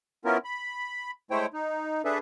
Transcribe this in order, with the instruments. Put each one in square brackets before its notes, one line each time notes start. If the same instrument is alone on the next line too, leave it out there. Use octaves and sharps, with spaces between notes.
[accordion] B3 C#4 E4 F4 A#4
B5
G#3 A3 E4 C5 C#5 G5
D#4
D4 G#4 A4 B4 E5